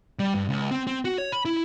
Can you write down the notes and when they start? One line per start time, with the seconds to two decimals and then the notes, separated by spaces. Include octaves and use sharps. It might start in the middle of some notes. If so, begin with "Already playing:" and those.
0.19 G3
0.35 G2
0.49 C#2
0.71 C4
0.87 C4
1.05 F#4
1.18 C#5
1.32 B5
1.45 E4